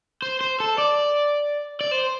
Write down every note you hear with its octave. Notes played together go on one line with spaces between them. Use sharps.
C5
C5
A4
D5
D5
C5